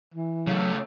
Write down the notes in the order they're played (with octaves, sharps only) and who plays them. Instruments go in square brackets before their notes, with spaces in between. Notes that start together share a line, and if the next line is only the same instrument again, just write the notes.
[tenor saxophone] E3
[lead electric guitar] C#3 A3 [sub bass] F#3